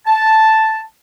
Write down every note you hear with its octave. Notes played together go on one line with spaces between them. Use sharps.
A5